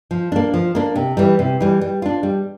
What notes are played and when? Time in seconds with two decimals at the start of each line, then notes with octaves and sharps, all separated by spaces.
0.11 F3
0.32 A#3 D4
0.54 F3
0.75 A#3 D4
0.96 C3
1.17 E3 G3
1.39 C3
1.60 E3 G3
1.81 G3
2.02 D4 F4
2.23 G3